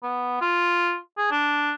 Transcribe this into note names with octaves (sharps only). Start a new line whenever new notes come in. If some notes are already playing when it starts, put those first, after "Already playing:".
B3
F4
G#4
D4